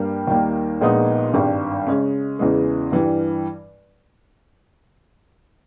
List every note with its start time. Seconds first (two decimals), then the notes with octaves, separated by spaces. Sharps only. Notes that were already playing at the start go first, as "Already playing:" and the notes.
Already playing: G2 G3 A#3
0.27 D#2 D#3 G3 A#3
0.81 A#1 A#2 G#3 B3 D#4
1.34 G#1 G2 G3
1.87 C#3 G#3 C#4
2.39 E2 C#3 E3 G#3
2.92 G2 E3 G3